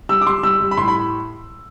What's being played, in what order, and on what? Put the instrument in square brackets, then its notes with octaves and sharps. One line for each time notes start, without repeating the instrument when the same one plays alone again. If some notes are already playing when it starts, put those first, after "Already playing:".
[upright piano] G3 E6
D6
G3 C6
G3 E6
G3
B5
A2 C6
B5